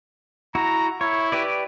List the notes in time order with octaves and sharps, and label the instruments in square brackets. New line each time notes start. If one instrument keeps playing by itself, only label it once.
[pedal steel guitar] E4 F#4 [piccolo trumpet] A#5
[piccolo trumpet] E4 [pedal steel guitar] C#5
[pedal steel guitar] G4 B4 D5